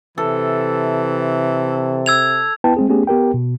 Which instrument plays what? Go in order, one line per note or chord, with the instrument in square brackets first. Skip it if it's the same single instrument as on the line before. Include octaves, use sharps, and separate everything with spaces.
[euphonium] C3 [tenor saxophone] E3 [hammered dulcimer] A4
[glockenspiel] E6 G#6 F7
[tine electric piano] B3 E4 B4 G5 A5
G#3 C4 G#4
A3 B3 C#4 G4 G#4
B3 G4 A#4 G5
B2